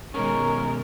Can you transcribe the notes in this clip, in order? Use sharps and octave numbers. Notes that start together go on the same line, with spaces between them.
B2 D#3 G#3 C#4 A#4 C#5